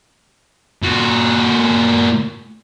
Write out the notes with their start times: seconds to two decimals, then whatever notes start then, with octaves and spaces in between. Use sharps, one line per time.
0.83 A#2 F#4